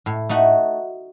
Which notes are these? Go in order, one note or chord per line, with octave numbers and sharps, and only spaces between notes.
A2
A3 D#4 F#4